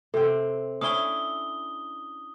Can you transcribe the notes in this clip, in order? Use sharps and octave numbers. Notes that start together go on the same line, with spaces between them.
C3 C4 A4
C#4 D4 E4 D#6 G7